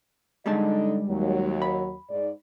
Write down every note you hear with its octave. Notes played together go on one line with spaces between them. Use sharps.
D3 G3 G#3 D#4 D#5 A5
D#2 F#3
B5
G#2 D5